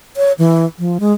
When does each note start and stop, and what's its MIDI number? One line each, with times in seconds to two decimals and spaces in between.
0.17 0.32 73
0.39 0.65 52
0.79 0.98 53
1.00 1.13 56